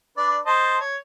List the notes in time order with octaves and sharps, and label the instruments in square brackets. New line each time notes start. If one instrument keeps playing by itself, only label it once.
[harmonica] D4 B4 D5
C5 D#5 A5
C#5